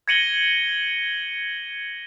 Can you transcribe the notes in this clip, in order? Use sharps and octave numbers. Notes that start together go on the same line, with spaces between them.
G#6 A#6 C#7 D#7 F#7 G7